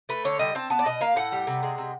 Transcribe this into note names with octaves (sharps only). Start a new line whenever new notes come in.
A3 B4
D3 C#5
G3 D#5
C4 A5
B3 A5
D5
B2 D#5
A#3 F5
A2 F#5
G3
C3
G#3
C3